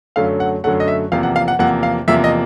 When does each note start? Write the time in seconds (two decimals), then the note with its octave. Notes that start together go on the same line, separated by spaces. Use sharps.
0.16 F#2 D3 F#3 A3 F5
0.40 F#5
0.64 F#2 D3 F#3 A3 F#5
0.80 D#5
0.88 E5
1.12 E2 C3 F3 A#3 F5
1.23 F#5
1.36 F5
1.48 F#5
1.59 E2 C3 F3 A#3 F#5
1.83 F5
2.08 E2 C3 F3 A#3 E5
2.24 D#5